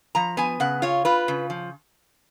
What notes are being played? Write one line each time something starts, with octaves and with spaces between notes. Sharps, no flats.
F3 A#5
B3 G#5
C#3 F#5
F4 C#5
F4 B4
C#3
F3